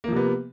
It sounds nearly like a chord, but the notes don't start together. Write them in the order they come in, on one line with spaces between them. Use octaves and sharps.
A#3 F3 C3 B3